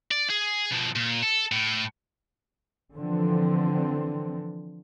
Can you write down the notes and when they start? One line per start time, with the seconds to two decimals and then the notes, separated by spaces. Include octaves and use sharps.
0.11 D5
0.30 G#4
0.71 B2 F3
0.96 A#2
1.23 A4
1.52 A2
2.94 D3 E3 F3 C4